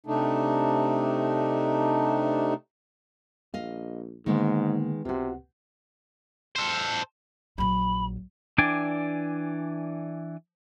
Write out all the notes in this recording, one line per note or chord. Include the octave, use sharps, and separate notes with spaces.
C3 A3 D4 D#4
A#1 D#5 F5
G#2 D3 D#3 G#3 A#3 B3
C#2 C3 F4 F#4
A4 C5
A#1 F#3 B5
E3 D4 D5 G5 G#5